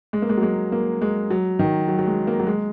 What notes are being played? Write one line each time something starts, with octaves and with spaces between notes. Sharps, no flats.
G#3
A#3
G#3
F#3
G#3
A#3
G#3
F#3
D#3
F#3
F#3
G#3
A#3
F#3
G#3